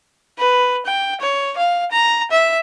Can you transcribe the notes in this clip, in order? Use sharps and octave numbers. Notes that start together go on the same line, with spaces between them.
B4
G5
C#5
F5
A#5
E5